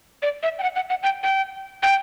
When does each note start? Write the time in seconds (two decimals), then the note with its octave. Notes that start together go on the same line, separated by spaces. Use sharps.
0.22 D5
0.43 E5
0.59 G5
0.63 F#5
0.75 F#5
0.90 F#5
1.03 G5
1.23 G5
1.83 G5